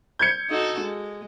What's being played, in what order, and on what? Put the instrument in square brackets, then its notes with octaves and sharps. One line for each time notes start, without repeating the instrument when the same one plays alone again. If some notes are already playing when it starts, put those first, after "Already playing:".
[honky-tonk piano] G6 G#6 C#7
[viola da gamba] D#4 F#4 A4
G#3